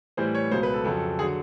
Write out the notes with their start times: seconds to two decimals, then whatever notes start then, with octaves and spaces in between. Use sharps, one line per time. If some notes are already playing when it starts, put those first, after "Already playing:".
0.17 A2 E3 G3 C5
0.35 C#5
0.51 C#2 B2 F#3 C5
0.63 B4
0.74 A4
0.85 F2 C#3 F#3 A4
1.19 D3 F#3 G#4